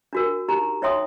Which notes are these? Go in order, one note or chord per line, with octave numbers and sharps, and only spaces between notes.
D4 F#4 A#4
D#4 G4 A#5
D#4 C#5 E5 G5 C6 D#6